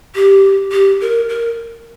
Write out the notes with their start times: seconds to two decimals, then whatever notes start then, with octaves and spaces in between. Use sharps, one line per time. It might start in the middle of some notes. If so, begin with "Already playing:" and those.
0.15 G4
0.72 G4
1.01 A#4
1.29 A#4